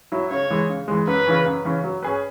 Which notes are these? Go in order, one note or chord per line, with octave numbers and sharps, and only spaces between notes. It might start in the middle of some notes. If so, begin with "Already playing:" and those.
F#3 E4
C#3 C#5
E3 G#3
C#3
E3 G#3
F#2 B4
C#3 E3 C#4
F#2
C#3 E3 C#4
F#3
C#4 G#4 B4